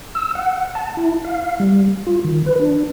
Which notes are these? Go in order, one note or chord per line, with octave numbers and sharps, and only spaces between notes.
E6
F#5
A5
E4
F5
G3
F4
D#3
B4
D4